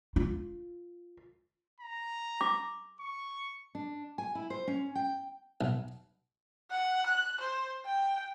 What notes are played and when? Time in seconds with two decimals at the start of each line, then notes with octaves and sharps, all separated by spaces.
0.16 F4
1.80 A#5
2.41 D6
3.00 C#6
3.75 D4
4.18 G#5
4.35 E4
4.50 C5
4.68 C#4
4.95 G5
5.61 B1
6.71 F#5
7.06 F#6
7.41 C5
7.85 G5